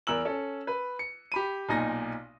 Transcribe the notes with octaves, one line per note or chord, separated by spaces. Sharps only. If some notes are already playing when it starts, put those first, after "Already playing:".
E2 A#4 E6 F#7
C#4 A4
B4
C#7
G4 B5 D#7
B1 A#2 D#4 G#5 A#6